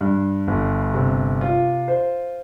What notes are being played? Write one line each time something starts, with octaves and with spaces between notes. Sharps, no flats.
G2
G1
C3
F4
C5